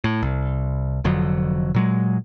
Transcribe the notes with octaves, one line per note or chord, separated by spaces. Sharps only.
A2
C2
F1 F2 D3 F#3
A#2 F#3 G#3